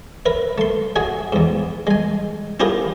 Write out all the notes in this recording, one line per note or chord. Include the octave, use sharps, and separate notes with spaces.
A#4 B4 E5
A3 C6
F#4 G#4 E5 G#5
E2 G#2
G#3 G#5
E4 F4 G4 G#4 A#4